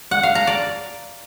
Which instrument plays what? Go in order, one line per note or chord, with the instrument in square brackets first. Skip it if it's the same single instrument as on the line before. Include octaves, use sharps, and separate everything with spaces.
[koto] F#5
F5
A#5
D5